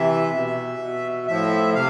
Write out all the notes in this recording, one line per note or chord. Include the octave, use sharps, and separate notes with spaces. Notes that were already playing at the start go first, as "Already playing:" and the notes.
Already playing: C3 E3 E5
B2
B2
A2 F3 E5
C3 F5